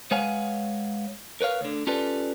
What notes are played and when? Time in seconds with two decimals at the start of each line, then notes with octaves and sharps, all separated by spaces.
0.11 G#3 B4 C#5 F5 F#5 G#5
1.41 A#4 B4 C#5 F5
1.61 D2 D3
1.87 C#4 F4 G4 A4 B4 D5